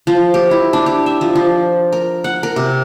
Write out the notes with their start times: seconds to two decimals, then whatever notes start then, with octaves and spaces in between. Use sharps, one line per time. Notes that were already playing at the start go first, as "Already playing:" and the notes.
0.07 F3
0.34 G4
0.51 E4
0.73 D4
0.86 G4
1.06 E5
1.21 F3
1.36 F3
1.92 A#4
2.24 F#5
2.43 A#4
2.56 C3